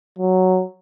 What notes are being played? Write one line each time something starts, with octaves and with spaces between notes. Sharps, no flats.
F#3